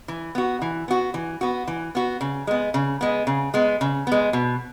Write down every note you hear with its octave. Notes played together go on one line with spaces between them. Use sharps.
E3
B3 F#4
E3
B3 F#4
E3
B3 F#4
E3
B3 F#4
C#3
G#3 B3
C#3
G#3 B3
C#3
G#3 B3
C#3
G#3 B3
B2